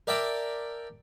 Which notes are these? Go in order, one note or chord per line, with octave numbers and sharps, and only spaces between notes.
A#4 D5 E5 G5 A5 A#5